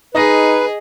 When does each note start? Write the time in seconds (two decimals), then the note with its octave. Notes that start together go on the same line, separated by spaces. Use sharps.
0.15 D#4 G#4 B4 D#5 A#6